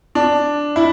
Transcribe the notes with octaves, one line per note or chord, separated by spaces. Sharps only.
D4
E4